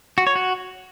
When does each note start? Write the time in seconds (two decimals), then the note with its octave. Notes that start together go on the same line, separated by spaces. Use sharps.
0.18 F#4
0.27 C#5
0.36 F#4